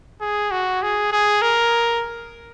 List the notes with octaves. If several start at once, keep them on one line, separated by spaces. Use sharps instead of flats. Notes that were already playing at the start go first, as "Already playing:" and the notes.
G#4
F#4
G#4
G#4
A#4